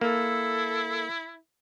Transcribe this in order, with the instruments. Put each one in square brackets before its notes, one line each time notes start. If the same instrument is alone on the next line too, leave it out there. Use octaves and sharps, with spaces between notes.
[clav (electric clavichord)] A#3 [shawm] E4 [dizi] A4